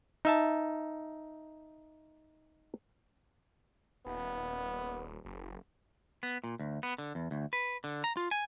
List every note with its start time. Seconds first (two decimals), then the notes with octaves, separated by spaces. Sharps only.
0.25 D#4 E5 A5
4.06 D#1 B3
5.25 F#1
6.23 B3
6.44 A#2
6.59 D2
6.83 B3
6.98 D3
7.15 E2
7.31 D2
7.53 B4
7.84 D3
8.04 A#5
8.17 F4
8.31 G#5